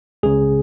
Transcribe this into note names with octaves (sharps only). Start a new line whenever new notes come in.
C#2 C#3 G#4